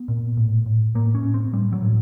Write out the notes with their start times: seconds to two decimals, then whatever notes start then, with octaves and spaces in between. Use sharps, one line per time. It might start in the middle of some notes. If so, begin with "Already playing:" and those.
Already playing: B3
0.08 A#2
0.37 A2
0.66 A2
0.95 A2 A#3
1.15 C#4
1.25 A2
1.34 C4
1.53 A2 G3
1.73 F#3
1.82 A2